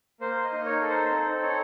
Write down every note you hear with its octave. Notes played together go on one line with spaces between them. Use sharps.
A#3 C5
D#5
D#4
C#5
A4
C5
C4
D#4 C#5